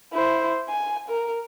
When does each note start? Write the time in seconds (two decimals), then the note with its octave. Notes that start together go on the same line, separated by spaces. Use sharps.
0.13 E4 C5
0.69 G#5
1.09 A#4